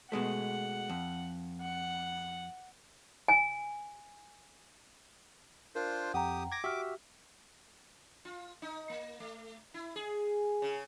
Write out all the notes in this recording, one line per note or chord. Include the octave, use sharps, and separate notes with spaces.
B2 G#3 A3 F#5
F2
F#5
G#5
D4 F4 A#4 C5
F2 G4 F#5 G5 A#5 D#6
D6 G#6 A#6
F#4 G4 E5 E6 F6
F4
D#4
A#3
A3
E4
G#4
C#3